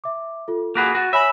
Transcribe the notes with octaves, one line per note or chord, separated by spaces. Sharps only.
E5 D6
F4 A4
A#3 F#4 G#4 B5 B6 D7
F#4 A6 A#6 D#7
C#5 E5 G#5 B5 A#6